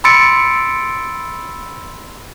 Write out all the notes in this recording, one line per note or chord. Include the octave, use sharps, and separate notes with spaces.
B5 C6 E6 A6 C#7 D7